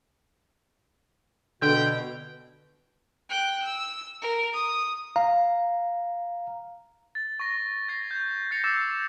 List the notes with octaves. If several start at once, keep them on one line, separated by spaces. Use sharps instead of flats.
B2 D3 G5
G5 F#6
E6
A#4
D#6
F5 A#5
A6
C#6 A#6
G#6 A#6 C7
G6 G#6
G6 A6 A#6 C7 C#7 F7
D6 E6 G6 A6 C7 E7